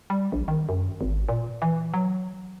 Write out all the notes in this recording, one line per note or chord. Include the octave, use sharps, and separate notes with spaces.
G3
A#1
D#3
F#2
G#1
A#2
E3
F#3